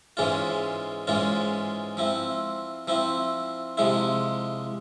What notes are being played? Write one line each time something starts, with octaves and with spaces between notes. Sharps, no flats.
G#2 E3 G#3 C#4 F4
G#2 E3 G#3 C#4 F4
F3 C4 E4
F3 C4 E4
C3 F3 G#3 E4